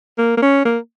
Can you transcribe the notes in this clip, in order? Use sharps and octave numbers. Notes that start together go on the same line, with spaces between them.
A#3
A#3
C#4
A#3